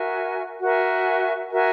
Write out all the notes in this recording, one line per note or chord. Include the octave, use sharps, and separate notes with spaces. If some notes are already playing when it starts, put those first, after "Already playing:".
Already playing: F#4 A#4 E5 G#5
F#4 A#4 E5 G#5
F#4 A#4 E5 G#5